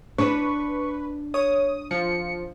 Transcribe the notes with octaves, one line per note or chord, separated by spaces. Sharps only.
D4 B4 C#6
C#5 D#6
F3 C#7